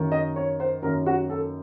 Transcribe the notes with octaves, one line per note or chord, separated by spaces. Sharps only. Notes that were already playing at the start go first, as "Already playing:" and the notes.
Already playing: F#2 D#3 A#3
D#5
C#5
C5
F#2 D#3 A#3 A#4
F#4
A4